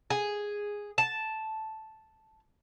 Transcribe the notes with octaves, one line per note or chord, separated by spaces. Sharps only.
G#4
A5